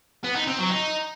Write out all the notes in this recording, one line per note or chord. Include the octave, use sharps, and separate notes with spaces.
B3
D#4
C4
F#3
D#4